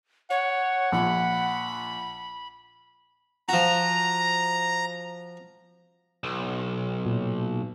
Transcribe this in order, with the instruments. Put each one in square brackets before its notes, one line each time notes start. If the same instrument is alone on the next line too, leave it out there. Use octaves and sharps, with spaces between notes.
[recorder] C#5 [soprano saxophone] F#5
[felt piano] A#1 [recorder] B5
[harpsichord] F3 F#4 [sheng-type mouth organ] A#5
[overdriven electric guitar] B1
[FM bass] A#2